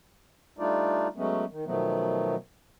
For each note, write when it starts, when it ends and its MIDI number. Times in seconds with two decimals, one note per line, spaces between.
0.59 1.08 55
0.59 1.08 57
0.59 1.08 62
0.59 1.08 63
0.59 1.08 65
0.59 1.08 74
1.16 1.45 54
1.16 1.45 56
1.16 1.45 57
1.16 1.45 59
1.16 1.45 61
1.51 1.65 51
1.66 2.35 47
1.66 2.35 51
1.66 2.35 53
1.66 2.35 54
1.66 2.35 57
1.66 2.35 59